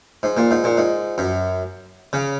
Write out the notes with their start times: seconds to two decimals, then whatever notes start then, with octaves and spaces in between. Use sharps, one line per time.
0.23 G#2
0.37 A#2
0.51 G#2
0.64 A#2
0.77 G#2
1.18 F#2
2.13 C#3